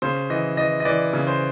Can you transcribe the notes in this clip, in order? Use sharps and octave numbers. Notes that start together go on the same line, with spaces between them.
C#3 C5
E3 D#5
E3 D#5
D#5
E3 D5
C#3
C5